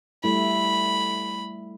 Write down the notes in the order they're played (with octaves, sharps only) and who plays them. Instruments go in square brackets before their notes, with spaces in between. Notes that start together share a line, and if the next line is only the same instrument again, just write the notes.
[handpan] G3 A3 E4 [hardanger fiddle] B5